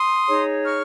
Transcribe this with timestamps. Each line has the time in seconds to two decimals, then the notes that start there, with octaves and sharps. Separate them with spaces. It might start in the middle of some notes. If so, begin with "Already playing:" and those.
Already playing: C6 D#6
0.28 D#4 G#4 C#5
0.64 C#6 F6